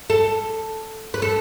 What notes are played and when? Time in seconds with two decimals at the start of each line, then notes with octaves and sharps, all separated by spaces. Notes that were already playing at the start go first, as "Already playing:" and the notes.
0.10 A4
1.14 B4
1.22 A4